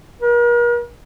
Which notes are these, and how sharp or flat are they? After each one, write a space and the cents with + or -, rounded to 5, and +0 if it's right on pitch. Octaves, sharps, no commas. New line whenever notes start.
A#4 +45